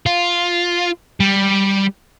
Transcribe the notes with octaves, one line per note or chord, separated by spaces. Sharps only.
F4
G3